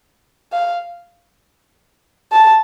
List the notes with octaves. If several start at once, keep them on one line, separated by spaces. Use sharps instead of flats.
F5
A5